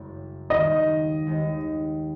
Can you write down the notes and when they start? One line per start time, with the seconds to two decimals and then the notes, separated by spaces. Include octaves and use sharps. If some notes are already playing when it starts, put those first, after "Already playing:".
Already playing: F#1 F#2 C#3 G#3
0.50 D#2 D#3 G#3 D#5
1.27 D#2 D#3 G#3